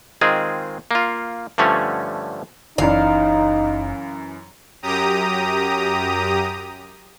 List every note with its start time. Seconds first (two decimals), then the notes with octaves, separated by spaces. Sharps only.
0.21 D#3 G#3 C4 F4 G#4
0.91 A#3 F4
1.58 G2 D3 F3 A3 C#4 C#5
2.78 F#1 F#2 E3 D#4 F5
4.82 F#2 G4 A#5 D#6